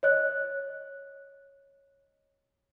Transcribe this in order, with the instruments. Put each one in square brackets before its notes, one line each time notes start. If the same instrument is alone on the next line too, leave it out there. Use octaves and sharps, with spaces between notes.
[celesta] C#5 D#5 F#6